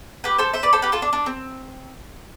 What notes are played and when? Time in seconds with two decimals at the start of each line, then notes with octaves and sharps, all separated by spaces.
0.24 G4 B4
0.38 A4 C5
0.53 C5 E5
0.63 B4 D5
0.73 A4 C5
0.82 G4 B4
0.92 F4 A4
1.02 D4
1.13 D4
1.26 C4